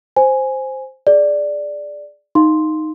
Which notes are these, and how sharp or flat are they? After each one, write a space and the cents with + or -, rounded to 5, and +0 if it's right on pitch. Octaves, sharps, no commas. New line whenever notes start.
C5 +0 G#5 +0
G#4 +5 D5 +0
D#4 +0 F5 +0 C6 +0